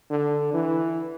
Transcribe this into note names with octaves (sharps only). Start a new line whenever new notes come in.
D3
E3